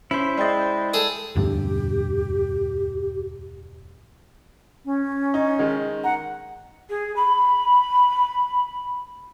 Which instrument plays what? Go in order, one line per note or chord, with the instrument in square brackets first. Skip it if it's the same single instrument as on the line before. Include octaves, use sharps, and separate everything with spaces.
[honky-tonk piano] C#4 [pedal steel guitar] E4 C5
[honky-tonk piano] G#3 D#5 [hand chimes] D5 G5 A6
[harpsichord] G#4 A4
[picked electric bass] E1 D2 G2 [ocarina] G4
[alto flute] C#4
[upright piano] D#4
D#3 G#3
[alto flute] F#5 [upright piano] A#5
[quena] G#4
B5